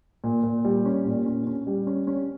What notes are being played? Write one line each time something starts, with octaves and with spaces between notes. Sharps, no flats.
A#2
A#2
G3
C#4
A#2
C#4
C#4
G3
C#4
C#4